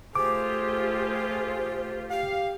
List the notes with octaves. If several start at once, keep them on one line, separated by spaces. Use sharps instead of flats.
A3 F4 G4 G#4 C5 D6
G4 F5